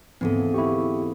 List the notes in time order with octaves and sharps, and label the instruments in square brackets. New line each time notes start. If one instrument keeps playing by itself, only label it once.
[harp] D2 G#2 E3 [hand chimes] B3 C4 A4
[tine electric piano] E4 G4 [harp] F#5 C#6